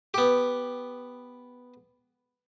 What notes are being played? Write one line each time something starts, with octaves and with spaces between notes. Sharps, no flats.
B3 G4